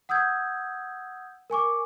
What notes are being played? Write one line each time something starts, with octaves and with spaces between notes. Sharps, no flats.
F#5 D#6 E6 G6 G#6
A#4 G#5 C#6 D6